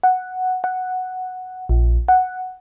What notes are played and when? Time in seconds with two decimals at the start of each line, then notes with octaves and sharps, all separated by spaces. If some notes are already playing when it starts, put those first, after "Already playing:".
0.04 F#5
0.64 F#5
1.69 A#1
2.08 F#5